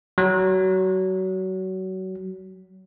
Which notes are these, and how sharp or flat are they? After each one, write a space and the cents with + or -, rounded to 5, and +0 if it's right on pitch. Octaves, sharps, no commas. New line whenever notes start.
F#3 +25